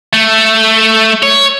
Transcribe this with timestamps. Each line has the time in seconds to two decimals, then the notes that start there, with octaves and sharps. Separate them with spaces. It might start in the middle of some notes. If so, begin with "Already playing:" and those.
0.13 A3
1.23 C#5